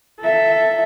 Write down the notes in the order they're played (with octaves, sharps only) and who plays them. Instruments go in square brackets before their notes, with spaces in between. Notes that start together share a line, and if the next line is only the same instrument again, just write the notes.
[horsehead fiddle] A4 E5